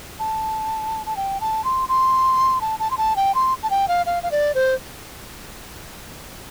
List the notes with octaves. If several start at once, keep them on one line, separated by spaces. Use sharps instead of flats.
A5
A5
G5
A5
C6
C6
A5
A5
C6
A5
G5
C6
A5
G5
F5
F5
F5
D5
C5